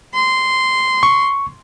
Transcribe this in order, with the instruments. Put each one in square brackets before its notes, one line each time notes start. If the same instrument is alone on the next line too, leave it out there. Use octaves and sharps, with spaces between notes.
[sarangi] C6
[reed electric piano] C#6